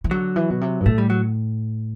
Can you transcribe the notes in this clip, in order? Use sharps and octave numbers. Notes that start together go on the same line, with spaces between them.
E3
D3 F#3
E3
B2
C3
G2
A2 A3
G3
F#3